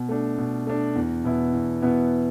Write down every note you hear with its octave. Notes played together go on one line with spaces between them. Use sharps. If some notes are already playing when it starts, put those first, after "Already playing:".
Already playing: B2
A3 D4
B2
A3 D4
E2
B2 B3 E4
E2
B2 B3 E4